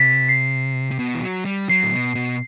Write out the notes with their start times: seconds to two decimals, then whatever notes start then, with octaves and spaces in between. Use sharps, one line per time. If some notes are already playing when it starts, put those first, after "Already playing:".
Already playing: C3 A6 B6
0.29 C7
0.91 C3
0.99 B2
1.15 E3
1.22 F#3
1.45 G3
1.69 F#3 C7
1.83 A2
1.92 B2
2.15 B2